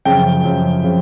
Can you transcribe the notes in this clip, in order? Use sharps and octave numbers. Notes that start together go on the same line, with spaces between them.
F#2 C#3 F3 G5
F#2 C#3 F3
C#3 F3